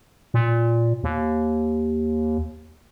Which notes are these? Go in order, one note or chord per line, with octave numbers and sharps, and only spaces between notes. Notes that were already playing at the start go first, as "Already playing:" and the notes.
A#2
D#2